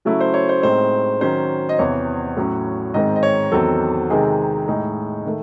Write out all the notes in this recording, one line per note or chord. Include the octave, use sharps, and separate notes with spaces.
C#3 F#3 A3 C#4 E4
C5
C#5
C5
A2 G#3 C4 D#4 C5
D#3 F#3 C#4 C5
D#5
E2 C3 E3 C#5
A2 F#3 C#4
G#2 D#3 G#3 C4 D#5
D#5
C#5
E2 D#3 F#3 C4 A4
C3 D#3 G#3 C4 D#4 G#4
A2 G#3 D#4
D#3 A3